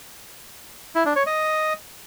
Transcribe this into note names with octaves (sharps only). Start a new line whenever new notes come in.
E4
D4
C#5
D#5